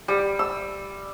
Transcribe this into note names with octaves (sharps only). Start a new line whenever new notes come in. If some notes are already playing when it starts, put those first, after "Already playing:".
G3
E6